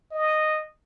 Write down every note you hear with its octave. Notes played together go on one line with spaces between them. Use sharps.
D#5